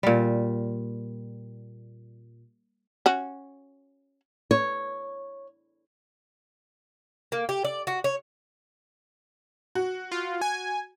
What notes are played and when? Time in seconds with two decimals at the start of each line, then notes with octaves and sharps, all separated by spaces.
0.03 A#2 G3
3.06 C#4 F#4
4.51 C#5
7.32 A#3
7.49 G4
7.64 D5
7.87 F#4
8.04 C#5
9.75 F#4
10.12 F4
10.41 G#5